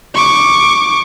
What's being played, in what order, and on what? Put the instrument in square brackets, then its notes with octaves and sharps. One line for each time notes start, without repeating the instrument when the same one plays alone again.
[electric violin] C#6 D6